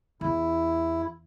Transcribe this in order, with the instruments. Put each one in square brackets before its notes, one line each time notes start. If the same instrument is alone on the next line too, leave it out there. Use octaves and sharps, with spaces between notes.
[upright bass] E2 [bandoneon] E4